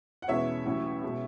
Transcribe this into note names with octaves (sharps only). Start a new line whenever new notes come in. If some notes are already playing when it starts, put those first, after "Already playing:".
F#5
E2 B2 G#3 C#4 E4 C#5 E5
A1 A2 F#3 C#4 E4
B2 G#3